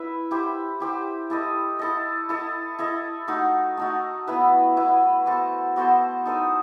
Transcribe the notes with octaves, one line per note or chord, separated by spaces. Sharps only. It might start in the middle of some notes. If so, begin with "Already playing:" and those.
Already playing: E4 B4 E5
E4 G4 C5
E4 G4 C5
E4 A4 D#5
E4 A4 D#5
E4 A4 D#5
E4 A4 D#5
A3 D#4 F#4
A3 D#4 F#4
B3 E4 B4 E5
B3 E4 B4 E5
B3 F#4 A4 C5
B3 F#4 A4 C5
D#4 A4 C5 D#5